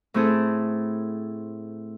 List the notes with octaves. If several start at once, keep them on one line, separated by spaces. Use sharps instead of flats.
A2 A3 C4 E4 G#4 A4